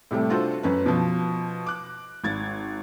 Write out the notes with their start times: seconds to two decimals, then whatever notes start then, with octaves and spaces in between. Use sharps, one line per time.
0.11 A2 C3 G3 A3
0.30 D4 F4 F#4 A4 C5
0.63 F#2 C#4 B4
0.86 B2 F3
1.66 D6 F#6
2.24 G#1 G#6 A6